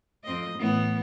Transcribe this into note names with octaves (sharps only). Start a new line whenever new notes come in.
F2 C4 D#5
A2 E3 B3